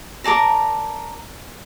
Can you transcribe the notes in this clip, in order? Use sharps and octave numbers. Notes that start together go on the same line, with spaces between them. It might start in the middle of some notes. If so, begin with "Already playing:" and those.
A#4 D5 A5 A#5